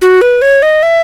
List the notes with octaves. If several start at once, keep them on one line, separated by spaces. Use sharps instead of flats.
F#4
B4
C#5
D#5
E5